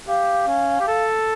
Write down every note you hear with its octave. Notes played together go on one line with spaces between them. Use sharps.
G4 F5
C#4
G4
A4